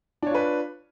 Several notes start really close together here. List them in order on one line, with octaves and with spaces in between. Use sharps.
D4 C#5 F4 B4